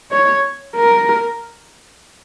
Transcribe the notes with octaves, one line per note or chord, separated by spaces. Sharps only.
C#5
A#4